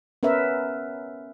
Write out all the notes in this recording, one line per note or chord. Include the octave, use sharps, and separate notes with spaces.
B3 C#4 A#4 B4 E5